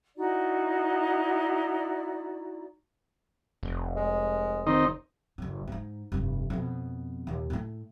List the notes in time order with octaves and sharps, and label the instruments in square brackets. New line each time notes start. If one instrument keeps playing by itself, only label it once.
[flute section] D#4 E4 F#4 D5
[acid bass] F1
[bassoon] G#3
[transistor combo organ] D#3 C4 D#4
[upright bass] F#1 A2
G#2 D#4
F1 G2
F2 B2
D#2 A#2
A2 A3